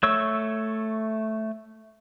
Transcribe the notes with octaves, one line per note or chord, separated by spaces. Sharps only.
A3 C#5 E6